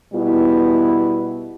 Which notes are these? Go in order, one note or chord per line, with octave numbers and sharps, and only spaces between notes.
B2 G3 B3 E4